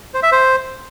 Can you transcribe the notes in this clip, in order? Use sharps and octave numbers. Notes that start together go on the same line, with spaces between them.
C5
E5
C5